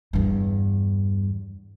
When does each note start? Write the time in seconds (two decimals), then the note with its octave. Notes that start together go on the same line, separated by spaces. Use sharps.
0.13 E2 G2